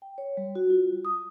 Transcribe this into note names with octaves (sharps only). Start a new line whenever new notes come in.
G5
C#5
G3
F#4
F4
G3
D#6